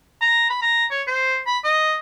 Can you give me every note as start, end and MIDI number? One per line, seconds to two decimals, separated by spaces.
0.21 0.49 82
0.50 0.61 83
0.62 0.85 82
0.91 1.02 73
1.07 1.39 72
1.46 1.58 83
1.64 1.98 75